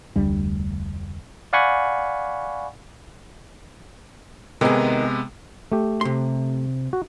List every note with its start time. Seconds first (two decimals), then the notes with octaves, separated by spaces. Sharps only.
0.16 F1 D2 G3 D4
1.53 D5 F5 F#5 G#5 B5 C#6
4.61 C3 D#3 G#3 B3 G#4
5.72 A3 G4
6.01 C3 C6
6.93 F#4